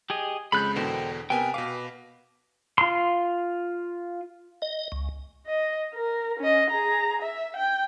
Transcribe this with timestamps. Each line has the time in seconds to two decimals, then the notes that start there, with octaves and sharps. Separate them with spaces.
0.10 G4 G#4 D#5
0.52 F2 C#3 G#3 B5 F#6 G6
0.76 E2 B2 D3 A#4 C5 G5
1.30 C3 B3 A#4 G5 G#5
1.54 B2 B4 F5 D6
2.78 F4 C6
4.62 D#5
4.92 C#2
5.47 D#5
5.94 A#4
6.40 C#4 D#5
6.70 G#4 A#5
7.22 E5
7.56 G5